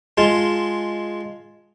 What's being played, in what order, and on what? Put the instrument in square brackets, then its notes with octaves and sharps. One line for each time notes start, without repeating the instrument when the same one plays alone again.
[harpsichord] G#3 F4 A5